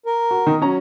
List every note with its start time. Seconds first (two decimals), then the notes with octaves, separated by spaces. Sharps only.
0.06 A#4
0.31 F#4
0.47 D#3
0.62 F#3 C#4 A#5